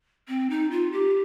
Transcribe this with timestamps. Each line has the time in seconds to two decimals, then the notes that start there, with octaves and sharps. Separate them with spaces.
0.28 C4
0.50 D#4
0.71 F4
0.92 G4